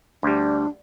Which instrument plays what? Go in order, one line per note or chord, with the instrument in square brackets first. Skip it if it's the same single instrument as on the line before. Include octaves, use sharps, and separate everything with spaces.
[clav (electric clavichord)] D2 G3 [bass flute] D4